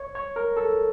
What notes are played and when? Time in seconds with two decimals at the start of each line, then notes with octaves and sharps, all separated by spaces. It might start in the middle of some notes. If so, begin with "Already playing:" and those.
Already playing: C#5
0.15 C#5
0.36 A#4
0.57 A4